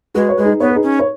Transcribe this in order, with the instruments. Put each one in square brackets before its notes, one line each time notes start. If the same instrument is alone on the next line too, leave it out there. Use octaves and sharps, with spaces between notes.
[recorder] G#3 [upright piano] F#4 B4
[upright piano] C#5
[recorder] G#3 [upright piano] B4
[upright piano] D#4 G#4
[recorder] B3 [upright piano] C#5
[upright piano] B4
D#4 G#4
[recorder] C#4
[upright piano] C#5